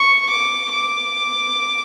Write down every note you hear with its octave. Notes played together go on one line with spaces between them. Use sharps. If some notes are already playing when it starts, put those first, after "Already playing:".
Already playing: C#6
D6
D6